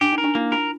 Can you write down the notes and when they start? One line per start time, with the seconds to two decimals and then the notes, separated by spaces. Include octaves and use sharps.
0.01 D4 G4
0.13 D#4
0.18 A#4
0.24 D4
0.35 A#3 E4
0.52 F4 A#4